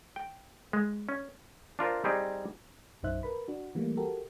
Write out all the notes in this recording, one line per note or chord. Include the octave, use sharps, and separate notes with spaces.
G5
G#3
C#4
D4 F4 A#4 C5
G3 C4 D#4 G4 G#4
B1 F#2 D#4 C5 E5 F#6
A#4 B4 B5
D4 F#4
E3 G3 A3 A#3
F#4 G4 A4 A#4